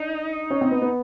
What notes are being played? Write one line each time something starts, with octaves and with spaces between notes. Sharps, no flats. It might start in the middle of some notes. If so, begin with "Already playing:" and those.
Already playing: D4 D#4
C#4
C4
B3
B3